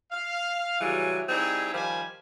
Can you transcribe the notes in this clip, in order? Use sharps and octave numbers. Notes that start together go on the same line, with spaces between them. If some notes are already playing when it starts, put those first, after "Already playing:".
F5
C#3 E3 F#3 G3 G#4
G3 C4 D#4 E4 G4 G#4
D#3 F3 G3 C5 G#5 B5